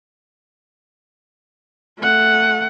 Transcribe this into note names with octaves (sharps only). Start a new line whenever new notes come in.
A3 F#5